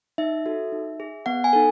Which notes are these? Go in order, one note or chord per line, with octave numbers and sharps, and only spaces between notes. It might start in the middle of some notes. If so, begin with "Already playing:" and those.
D#4 E5
F#4 A4
D#4
G#4
B3 F#5
G#5
D#4 A4